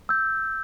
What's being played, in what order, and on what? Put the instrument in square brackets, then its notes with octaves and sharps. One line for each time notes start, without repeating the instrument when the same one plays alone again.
[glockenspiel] E6 G6